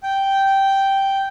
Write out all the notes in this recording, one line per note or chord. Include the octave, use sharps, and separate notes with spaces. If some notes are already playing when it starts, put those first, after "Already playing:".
G5